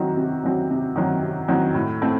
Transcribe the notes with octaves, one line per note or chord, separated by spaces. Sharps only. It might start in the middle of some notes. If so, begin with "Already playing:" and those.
Already playing: C3 D#3 F#3 C4 F#4
C3
D#3 F#3 C4 F#4
C3
D#3 F#3 C4 F#4
C3
D#3 F#3 C4 F#4
A2
A3 C4